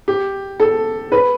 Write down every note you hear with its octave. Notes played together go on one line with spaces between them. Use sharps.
G4
A4
B4